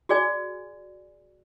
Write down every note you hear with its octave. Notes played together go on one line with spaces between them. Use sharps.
F#4 G#4 D5 G#5